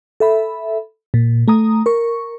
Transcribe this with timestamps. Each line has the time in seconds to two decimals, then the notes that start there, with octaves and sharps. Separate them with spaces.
0.20 A4 E5 B5
1.14 A#2
1.48 A3 A#5 D#6
1.86 A#4 C#6